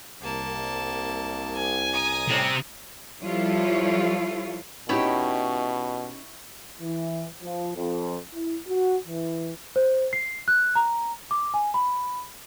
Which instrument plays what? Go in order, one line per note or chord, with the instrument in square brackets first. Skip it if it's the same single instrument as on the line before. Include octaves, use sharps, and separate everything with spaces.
[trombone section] C2 [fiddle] A#3 A5
[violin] G#5
[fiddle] A#5 D#6
[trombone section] A2 G3 [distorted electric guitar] C3 C4
[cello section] F3 G3 E4 F4 A4 C#5
[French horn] B2 [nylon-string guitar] C#4 D#4 G4 [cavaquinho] E4 C#5 G5
[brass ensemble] E3
F3
F2
E4
F#4
E3
[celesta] C5
C7
F#6
A#5
D6
G#5
B5